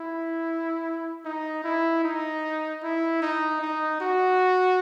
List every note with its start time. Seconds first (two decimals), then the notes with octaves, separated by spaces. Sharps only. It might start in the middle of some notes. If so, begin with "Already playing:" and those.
Already playing: E4
1.25 D#4
1.64 E4
2.04 D#4
2.83 E4
3.22 D#4
3.61 D#4
4.01 F#4